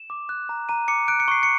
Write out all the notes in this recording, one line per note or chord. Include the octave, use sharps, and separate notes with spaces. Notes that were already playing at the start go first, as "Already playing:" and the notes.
Already playing: E7
D6
F#6
A#5
A#5 D#7
D6 C#7
F#6 D7
C#7
C#6 C7
C#7